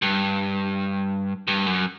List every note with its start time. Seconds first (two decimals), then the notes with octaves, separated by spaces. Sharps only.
0.02 G2
1.48 G2
1.66 F#2